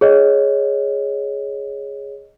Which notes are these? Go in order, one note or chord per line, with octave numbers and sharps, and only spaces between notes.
G#4 C#5 D#5